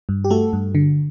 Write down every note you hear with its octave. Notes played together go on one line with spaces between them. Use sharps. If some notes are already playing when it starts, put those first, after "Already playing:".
G2
G4
A3 F#4 A4
G2
D3